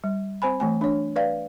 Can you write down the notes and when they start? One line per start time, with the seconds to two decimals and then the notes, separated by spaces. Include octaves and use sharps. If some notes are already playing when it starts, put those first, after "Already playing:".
0.04 G3
0.42 C4 C5 G#5 B5
0.60 E3 A3 G#5
0.81 D4 C#5
1.16 B4 D5 F5